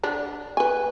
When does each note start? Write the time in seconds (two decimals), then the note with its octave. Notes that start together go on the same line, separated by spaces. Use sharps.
0.03 D3 D4
0.57 B4 G#5